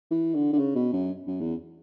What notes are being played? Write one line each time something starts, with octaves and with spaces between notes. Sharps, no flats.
E3
D3
D3
C#3
B2
F#2
F#2
E2